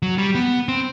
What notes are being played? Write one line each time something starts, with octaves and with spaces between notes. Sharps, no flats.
F#3
G3
B3
C4